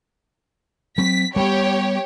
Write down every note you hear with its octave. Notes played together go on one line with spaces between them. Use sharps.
F#3 C4 B6
G3 B3 G4 C#5